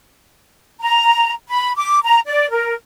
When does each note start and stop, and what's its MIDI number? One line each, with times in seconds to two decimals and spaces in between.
0.80 1.32 82
1.48 1.74 83
1.76 1.99 86
2.04 2.20 82
2.27 2.49 74
2.50 2.73 70